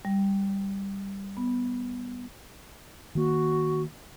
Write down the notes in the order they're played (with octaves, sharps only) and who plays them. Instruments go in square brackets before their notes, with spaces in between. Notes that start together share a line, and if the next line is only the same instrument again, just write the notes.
[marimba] G3
B3
[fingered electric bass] D#3 A#3 [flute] F#4